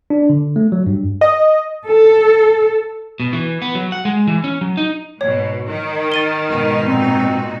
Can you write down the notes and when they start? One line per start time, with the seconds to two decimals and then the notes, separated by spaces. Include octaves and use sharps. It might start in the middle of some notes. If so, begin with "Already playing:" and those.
0.10 D4
0.30 D3
0.56 A3
0.72 F#3
0.86 G2
1.21 D#5
1.86 A4
3.20 B2
3.33 E3
3.62 B3
3.75 F#3
3.92 F#5
4.05 G#3
4.27 E3
4.44 C#4
4.61 F#3
4.77 D#4
5.21 G#2 B2 C#5
5.66 D#3
6.12 A6 D#7 G7
6.49 G#2 B2 D#4
6.87 A#2 C4 F#4